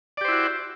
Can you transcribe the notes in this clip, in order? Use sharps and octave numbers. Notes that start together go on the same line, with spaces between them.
E4 F#4 G4 C5 D5